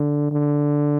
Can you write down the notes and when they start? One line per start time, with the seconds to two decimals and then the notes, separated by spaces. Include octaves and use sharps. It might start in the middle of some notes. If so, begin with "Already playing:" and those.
Already playing: D3
0.31 D3